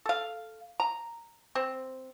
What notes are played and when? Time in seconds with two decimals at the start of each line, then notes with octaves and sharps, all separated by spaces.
0.06 A4 F5
0.80 A#5
1.55 C4